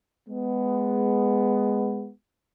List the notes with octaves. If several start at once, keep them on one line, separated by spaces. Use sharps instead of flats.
G#3 B3